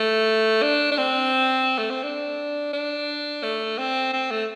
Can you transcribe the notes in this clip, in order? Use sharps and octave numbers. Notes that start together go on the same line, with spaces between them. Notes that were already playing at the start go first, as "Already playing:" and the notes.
Already playing: A3
D4
D4
C4
A3
C4
D4
D4
A3
C4
C4
A3